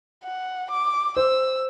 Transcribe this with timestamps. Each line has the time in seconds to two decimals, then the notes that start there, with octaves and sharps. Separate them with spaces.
0.24 F#5
0.71 D6
1.17 C5 E6